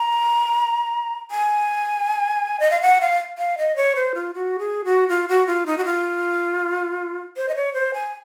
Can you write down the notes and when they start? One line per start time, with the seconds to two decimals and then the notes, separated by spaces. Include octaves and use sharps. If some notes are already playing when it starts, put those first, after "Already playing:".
Already playing: A#5
1.31 G#5
2.60 D#5
2.71 F5
2.81 F#5
3.01 F5
3.38 F5
3.58 D#5
3.76 C#5
3.95 C5
4.15 F4
4.34 F#4
4.59 G#4
4.85 F#4
5.09 F4
5.28 F#4
5.47 F4
5.66 D#4
5.78 F#4
5.85 F4
7.37 C5
7.49 D#5
7.55 C#5
7.74 C5
7.94 G#5